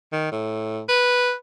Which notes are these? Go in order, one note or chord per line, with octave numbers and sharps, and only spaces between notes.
D#3
A2
B4